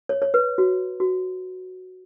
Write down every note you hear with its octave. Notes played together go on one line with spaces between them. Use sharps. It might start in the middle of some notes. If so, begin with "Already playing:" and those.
C#5
C#5
B4
F#4
F#4